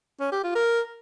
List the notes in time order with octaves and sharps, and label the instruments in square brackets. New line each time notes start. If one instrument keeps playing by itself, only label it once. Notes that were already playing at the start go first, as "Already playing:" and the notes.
[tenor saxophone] C#4
G4
F4
A#4